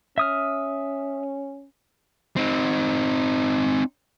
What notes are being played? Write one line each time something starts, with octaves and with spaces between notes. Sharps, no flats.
C#4 E5 D#6 F6
C4 D#4